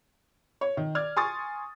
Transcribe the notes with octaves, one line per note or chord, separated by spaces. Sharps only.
C#5
D#3
D5 F6 G#6
G#5 C6 C#6 D#6 A6